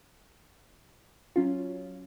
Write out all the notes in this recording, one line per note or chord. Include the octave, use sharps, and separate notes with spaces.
F#3 C#4 F4